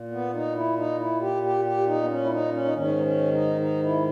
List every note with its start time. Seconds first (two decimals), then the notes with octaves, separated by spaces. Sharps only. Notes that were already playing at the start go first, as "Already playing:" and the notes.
Already playing: A#2
0.12 B3
0.34 D#4
0.55 E4
0.77 D#4
0.99 E4
1.21 G4
1.43 G4
1.65 G4
1.87 D#4
2.03 B3
2.09 C#4
2.24 E4
2.30 D#4
2.52 C#4
2.64 D#4
2.74 G#2 D#3 C#4
2.99 D#4
3.03 C#4
3.32 D#4
3.61 D#4
3.84 E4